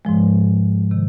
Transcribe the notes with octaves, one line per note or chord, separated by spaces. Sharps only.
G#2 F3 G#3
C3 D#3